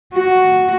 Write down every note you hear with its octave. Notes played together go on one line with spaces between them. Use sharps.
F#4